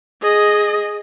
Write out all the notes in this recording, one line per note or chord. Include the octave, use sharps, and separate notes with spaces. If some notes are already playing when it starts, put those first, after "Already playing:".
G#4 D#5